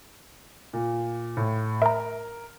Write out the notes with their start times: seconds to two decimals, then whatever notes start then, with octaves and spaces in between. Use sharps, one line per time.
0.73 A#2
1.37 A2
1.82 A#4 E5 A#5